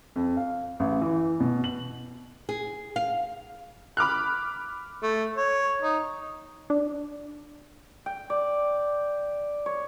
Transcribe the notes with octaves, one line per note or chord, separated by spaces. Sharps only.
F2
F5
A1
E3
B2
F#7
G#4
F5
B5 D6 F6 F#6
A3
C#5
D#4
D4
G5
D5
C#5